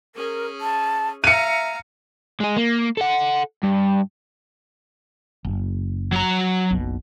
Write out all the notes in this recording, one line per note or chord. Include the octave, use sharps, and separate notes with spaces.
C#4 G#4 A#4
A5
E5 F5 A#5 C#7 D#7
G#3 G#4
A#3
A4 F#5
G2
F#1
F#3 A#5
F#1 B1 B2